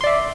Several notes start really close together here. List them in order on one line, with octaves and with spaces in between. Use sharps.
C6 D5 E5